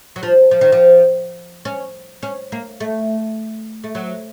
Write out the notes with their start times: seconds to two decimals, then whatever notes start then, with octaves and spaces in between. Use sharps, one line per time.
0.16 F#3
0.23 F3
0.51 F3
0.61 D#3
0.72 F3
1.65 C#4
2.23 C#4
2.52 A#3
2.80 A3
3.84 A3
3.95 F#3